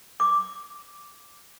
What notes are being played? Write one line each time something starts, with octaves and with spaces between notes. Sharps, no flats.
D6